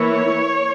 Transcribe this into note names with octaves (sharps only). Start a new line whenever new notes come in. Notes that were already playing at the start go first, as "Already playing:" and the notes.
Already playing: E3 A#3 E4 C#5